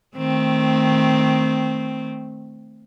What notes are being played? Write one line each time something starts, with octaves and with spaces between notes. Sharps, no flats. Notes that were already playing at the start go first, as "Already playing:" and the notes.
D#3 A3 C4